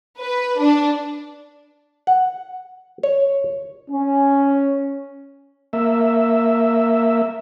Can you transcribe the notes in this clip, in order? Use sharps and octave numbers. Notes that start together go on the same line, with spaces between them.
B4
D4
F#5
C#5
C#4
A#3 E5